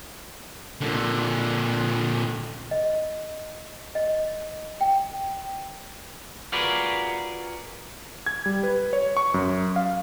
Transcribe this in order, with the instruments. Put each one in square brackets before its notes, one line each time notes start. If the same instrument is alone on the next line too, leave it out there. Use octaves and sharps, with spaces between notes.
[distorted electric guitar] A#2 D3
[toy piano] D#5
D#5
G5
[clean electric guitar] F4 F#4 G#4 A#4 B4 D5
[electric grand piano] G#6
G3
B4
C#5
C#6
F#2
F5